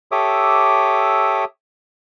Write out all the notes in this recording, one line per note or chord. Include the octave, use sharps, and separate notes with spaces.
G4 A4 C#5 E5 D6 D#6